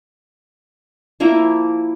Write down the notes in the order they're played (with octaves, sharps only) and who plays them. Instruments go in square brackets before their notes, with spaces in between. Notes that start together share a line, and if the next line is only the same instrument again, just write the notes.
[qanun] F3 A#3 E4 A#5